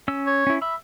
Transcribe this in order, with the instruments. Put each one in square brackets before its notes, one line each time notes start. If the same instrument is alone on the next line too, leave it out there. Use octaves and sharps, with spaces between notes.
[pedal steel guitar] C#4 E6
[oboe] C#5
[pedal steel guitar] C#4 E4
[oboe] E5 [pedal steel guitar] B5